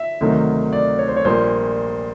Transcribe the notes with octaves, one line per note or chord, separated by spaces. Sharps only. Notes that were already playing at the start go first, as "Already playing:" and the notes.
Already playing: E5
D2 C3 D#3 F#3
D5
C#5
C5
C#5
A#1 A#2 G3 A#3 C5